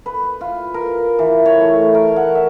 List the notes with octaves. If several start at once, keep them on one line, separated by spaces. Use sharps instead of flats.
B4
F4
A#4
E3
C#5
A3
A#4
F#5
E5